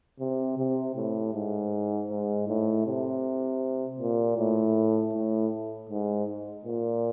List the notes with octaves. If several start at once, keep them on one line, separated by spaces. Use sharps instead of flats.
C3
C3
A2
G#2
G#2
A2
C3
A#2
A2
A2
G#2
A#2